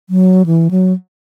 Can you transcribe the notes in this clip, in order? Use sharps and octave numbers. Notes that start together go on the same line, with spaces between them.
F#3
E3
F#3